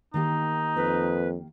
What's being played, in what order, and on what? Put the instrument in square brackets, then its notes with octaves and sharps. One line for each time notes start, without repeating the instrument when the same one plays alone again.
[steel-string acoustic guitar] D#3 A#3 G4 [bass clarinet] D#4
[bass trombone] F2 [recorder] B4